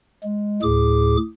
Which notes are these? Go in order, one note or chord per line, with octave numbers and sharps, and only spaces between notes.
G#3
D2 A2 G#4 D6